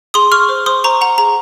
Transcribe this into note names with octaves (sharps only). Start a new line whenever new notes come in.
G#4 C6 D#6
G#4 C#6 F6
C5
C5 C6 D#6
C5 A#5 C#6
F#5 A#5
G#4 A#5